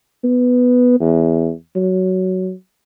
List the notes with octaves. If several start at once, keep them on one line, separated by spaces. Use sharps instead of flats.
B3
E2
F#3